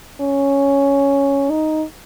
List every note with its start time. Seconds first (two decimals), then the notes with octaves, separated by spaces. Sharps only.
0.21 C#4
1.50 D#4